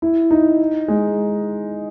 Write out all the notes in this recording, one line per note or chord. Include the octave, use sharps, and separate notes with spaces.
E4
D#4
G#3